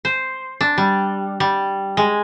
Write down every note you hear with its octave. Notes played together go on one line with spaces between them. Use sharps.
C5
D4
G3
G3
G#3